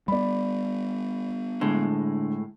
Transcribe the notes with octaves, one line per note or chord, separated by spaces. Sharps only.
G3 B3 D5 B5
A2 D3 G#3